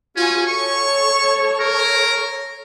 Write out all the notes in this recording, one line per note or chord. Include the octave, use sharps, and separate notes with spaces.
C#4 F4 F#4 G#5
A4 C#5 C#6
A#4